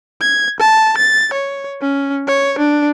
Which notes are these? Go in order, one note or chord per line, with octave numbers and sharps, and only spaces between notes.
G#6
A5
A6
C#5
C#4
C#5
D4